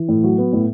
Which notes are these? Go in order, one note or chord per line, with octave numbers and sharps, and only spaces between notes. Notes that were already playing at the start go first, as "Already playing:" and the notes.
Already playing: E3
A2
F#3
B3
A2